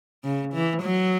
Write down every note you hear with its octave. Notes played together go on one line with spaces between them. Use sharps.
C#3
E3
F#3